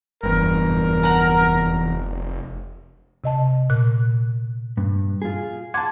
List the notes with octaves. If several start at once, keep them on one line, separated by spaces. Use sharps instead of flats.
F1 E2 G2 A#4
F#5 A#5
C3 D#5 A5
A#2 F#6
G2
F4 G#4
F#5 A5 C6 D6 G#6